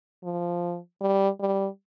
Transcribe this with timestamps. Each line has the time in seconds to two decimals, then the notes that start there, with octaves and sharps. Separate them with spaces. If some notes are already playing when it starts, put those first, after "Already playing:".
0.24 F3
1.01 G3
1.40 G3